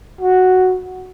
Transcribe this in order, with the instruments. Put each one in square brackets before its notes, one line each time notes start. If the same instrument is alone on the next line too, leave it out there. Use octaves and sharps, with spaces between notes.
[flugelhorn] F#4